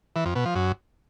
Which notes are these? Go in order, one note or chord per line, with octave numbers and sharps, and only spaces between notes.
E3
F2
B2
F3
F#2